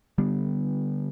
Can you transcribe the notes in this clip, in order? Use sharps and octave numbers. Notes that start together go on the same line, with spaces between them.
D3 G3 B3